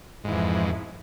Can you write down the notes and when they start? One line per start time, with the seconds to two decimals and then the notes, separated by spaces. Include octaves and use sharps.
0.24 G#2
0.28 E3
0.31 F2